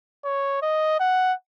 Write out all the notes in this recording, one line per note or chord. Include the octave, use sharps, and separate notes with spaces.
C#5
D#5
F#5